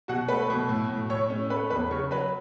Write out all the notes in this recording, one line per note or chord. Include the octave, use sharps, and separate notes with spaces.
B2 F#4 F#5
A3 B4 B5
B2
A2
A2
A2 C#5 C#6
C#4
A3 B4 B5
E2 B4 B5
C#3 C#5 C#6
F#3 B4 B5